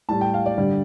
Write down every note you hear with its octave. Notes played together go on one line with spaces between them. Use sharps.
A2 G3 A5
G5
F5
D5
G2 D3 G3